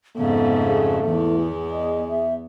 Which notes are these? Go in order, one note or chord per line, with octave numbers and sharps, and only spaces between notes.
F2 G#2 C#3 A3 B3
G#4
E2 E3 B3
G#4
D#5
E5